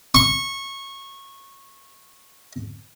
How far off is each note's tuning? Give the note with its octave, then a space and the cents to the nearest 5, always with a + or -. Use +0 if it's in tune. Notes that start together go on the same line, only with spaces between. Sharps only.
C#6 -20